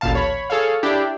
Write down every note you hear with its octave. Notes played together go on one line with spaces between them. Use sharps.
A1 D2 A#2 F5 A5
C#5 B5
G#4 A4 C#5 F5
D4 E4 G4 G5